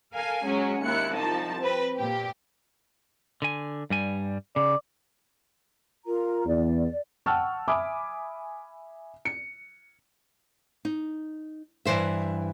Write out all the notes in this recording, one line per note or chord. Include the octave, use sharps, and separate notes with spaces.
A4 A#4 F5 G#5
F#3 G#3 C#4
D#2 E4 F#6 C#7
C2 F3 D#4 A5
C4 B4
A#2 G4
D3 G#5
G2 G3 G#5
C#3 D5
F4 A#4 A#5
E2 D5
F#5 G5 A5 C#6 E6 F6
E5 G#5 B5 D6 D#6
C#7
D#4
G2 B2 E3 C5 E5